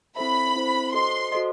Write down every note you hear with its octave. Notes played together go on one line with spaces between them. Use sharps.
C4 E4 A4 C5 E5 B5
C4 E4 A4 C5 E5
F#4 A4 C5 D#5 C6
F#4 A4 C5 D#5